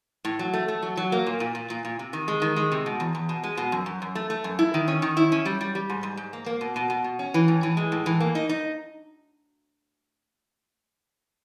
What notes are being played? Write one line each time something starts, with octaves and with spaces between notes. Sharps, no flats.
A2
F#3
A3
A3
F#3
F#3
A#3
A#2
A#2
A#2
A#2
A#2
C3
D#3
G#3
D#3
G#3
C3
B2
E2
E2
B2
G#3
B2
F#2
F#2
F#2
A3
A3
F#2
E4
D#3
C#4
D#3
E4
C#4
G3
G3
G3
G#2
G#2
G#2
A#3
A#3
B2
B2
B2
B2
C#4
E3
A2
E3
G#3
A2
E3
A#3
D#4
D#4